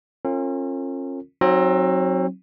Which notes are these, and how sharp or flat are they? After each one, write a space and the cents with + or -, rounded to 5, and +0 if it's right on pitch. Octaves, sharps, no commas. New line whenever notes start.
C#4 -40 F4 +0 A#4 -45
F#3 +0 C4 +30 D#4 +15